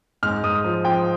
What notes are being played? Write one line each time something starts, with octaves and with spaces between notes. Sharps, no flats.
G#2 F6
G#2 D#6
F3
F3 G5